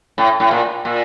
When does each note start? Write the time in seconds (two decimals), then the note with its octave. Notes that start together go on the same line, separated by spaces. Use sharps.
0.18 A2
0.40 A2
0.51 A#2
0.85 A#2